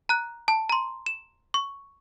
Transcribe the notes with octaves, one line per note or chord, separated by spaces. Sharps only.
A#5 F#6
A5
A#5 C6
E7
C#6